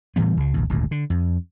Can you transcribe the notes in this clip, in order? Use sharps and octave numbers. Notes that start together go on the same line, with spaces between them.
A2 E3 G3 B3
C#2 C#3
A#1 D#2
D#1 G#1 D2 A#2
D3
F2